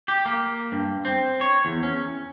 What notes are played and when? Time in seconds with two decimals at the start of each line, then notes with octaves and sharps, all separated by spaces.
0.08 G4
0.26 A#3
0.72 G2
1.05 C4
1.41 C#5
1.65 E2
1.83 C#4